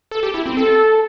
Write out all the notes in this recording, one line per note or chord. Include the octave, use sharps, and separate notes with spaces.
A4
G4
E4
C4
A4